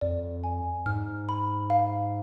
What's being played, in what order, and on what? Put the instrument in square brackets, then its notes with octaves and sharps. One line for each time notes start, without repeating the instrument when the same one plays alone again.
[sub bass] F2 [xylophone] D5
[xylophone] G#5
[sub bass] G#2 [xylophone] F6
[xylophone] B5
F5